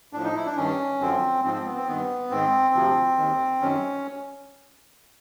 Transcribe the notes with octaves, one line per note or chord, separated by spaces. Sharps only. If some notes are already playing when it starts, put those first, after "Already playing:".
A2 F3 D4
D#4
E4
D4
G2 D#3 C#4
F#2 D3 F3 C4
G#2 F3 C4
C4
B3
C4
G2 D#3 B3
G#2 D#3 C4
D2 C3 F3
D#2 D#3
F#2 D#3 C#4